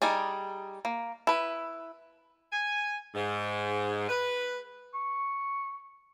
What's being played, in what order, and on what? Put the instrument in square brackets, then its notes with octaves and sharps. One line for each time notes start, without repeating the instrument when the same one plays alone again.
[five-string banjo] G3 D#4 G#4 D5
A#3
E4 B4
[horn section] G#5
G#2
B4
[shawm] C#6